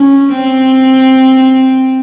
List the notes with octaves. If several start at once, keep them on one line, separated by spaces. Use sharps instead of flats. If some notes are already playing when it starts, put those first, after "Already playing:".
Already playing: C#4
C4